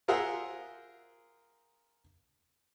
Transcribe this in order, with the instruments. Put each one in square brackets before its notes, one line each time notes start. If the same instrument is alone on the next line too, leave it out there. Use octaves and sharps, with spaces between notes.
[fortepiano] F4 G#4 A#4 C5 E5 F#5